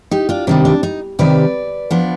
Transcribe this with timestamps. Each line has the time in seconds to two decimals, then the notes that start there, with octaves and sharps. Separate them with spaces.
0.11 D#4 G4
0.29 D4 F4
0.47 C3 D#3 G3 D4
0.65 D4
0.83 D#4
1.19 C3 D#3 G3 B4 D5
1.91 F3 B3 D4